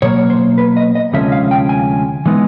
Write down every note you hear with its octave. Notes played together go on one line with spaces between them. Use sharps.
B2 F#3 A#3 C#5
C5
B4
D#5
D#5
D2 C3 F3 G#3 C#4 E5
F5
G5
G#5
E3 G#3 B3 D#4